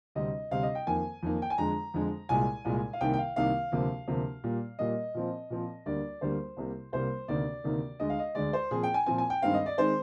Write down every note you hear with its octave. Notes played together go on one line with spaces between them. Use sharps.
D2 C3 G3 C4 D#5
D2 C3 G3 C4 F5
D#5
G5
F2 D#3 A#3 G#5
F2 D#3 A#3
G5
G#5
F2 D3 G#3 A#5
F2 D3 G#3
C2 A#2 G#3 G#5
C2 A#2 G#3
F5
C2 C3 D#3 A#3 G5
G5
F5
C2 C3 D#3 A#3 F5
D2 C3 F3 A#3
D2 C3 F3 A#3
A#2 G3 A#3
A#2 G3 A#3 D#5
A#2 F3 C4
A#2 F3 C4
D2 D3 G3 A#3 D5
D2 D3 G3 A#3 C5
C2 C3 G3 A#3
C2 C3 G3 A#3 C5
D2 C3 D#3 A#3 D5
D2 C3 D#3 A#3
D2 D3 G#3 D#5
F5
D#5
D2 D3 G#3 D5
C5
A#2 F3 C4 G#4
G5
G#5
A#2 F3 C4 G#5
G#5
G5
G2 D#3 G#3 C4 F5
D#5
D5
D#3 G#3 C4 C5